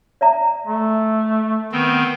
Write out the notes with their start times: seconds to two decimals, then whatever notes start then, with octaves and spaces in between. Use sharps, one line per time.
0.21 D5 E5 A#5
0.67 A3
1.72 D#3 B3 C4